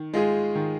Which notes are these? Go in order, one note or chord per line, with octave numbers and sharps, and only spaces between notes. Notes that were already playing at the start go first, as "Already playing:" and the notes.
Already playing: D#3
G#3 F4 G#4
D#3